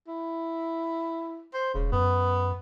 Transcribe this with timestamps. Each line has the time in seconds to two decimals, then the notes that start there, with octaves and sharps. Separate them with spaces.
0.08 E4
1.53 C5
1.74 E1 C#3
1.92 F#2 B3